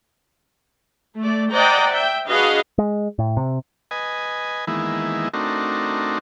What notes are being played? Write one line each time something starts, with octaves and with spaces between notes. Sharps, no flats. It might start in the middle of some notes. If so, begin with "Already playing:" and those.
A3 D5
C5 D5 D#5 F#5 G5 A#5
E5 G5
D4 F#4 G#4 B4 D#5 F5
G#3
A2
C3
B4 D#5 G#5
D#3 E3 G#3 A#3 B3 E4
A3 C4 D4 D#4 F#4 A#4